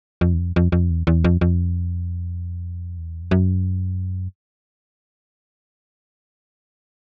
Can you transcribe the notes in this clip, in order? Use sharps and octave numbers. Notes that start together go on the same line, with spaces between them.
F2
E2
F2
F2
F2
E2
E2
F2
F2
E2
F2
F#2